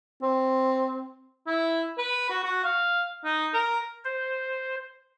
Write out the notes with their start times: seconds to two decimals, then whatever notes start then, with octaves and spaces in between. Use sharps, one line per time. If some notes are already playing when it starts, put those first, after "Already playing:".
0.22 C4
1.47 E4
1.98 B4
2.30 F#4
2.44 F#4
2.64 F5
3.25 D#4
3.54 A#4
4.05 C5